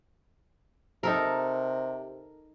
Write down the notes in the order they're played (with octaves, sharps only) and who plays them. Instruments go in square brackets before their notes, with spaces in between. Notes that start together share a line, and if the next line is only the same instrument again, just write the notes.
[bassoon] C3 [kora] D#4 A4 A#4